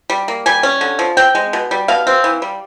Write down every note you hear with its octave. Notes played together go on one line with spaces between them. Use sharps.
G3
A#3
G3 G#5
C#4
D3
F3
C4 G5
G#3
B2
G3
B2 F5
C4
E3
G3